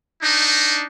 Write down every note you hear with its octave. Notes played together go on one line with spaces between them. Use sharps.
D4 D#4